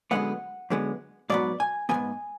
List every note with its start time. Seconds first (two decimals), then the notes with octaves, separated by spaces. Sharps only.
0.11 F#2 D3 G#3 B3 F#5
0.70 F#2 D3 G#3 B3
1.30 G#2 F#3 B3 D5
1.60 G#5
1.89 F#3 B3 G#5
1.94 G#2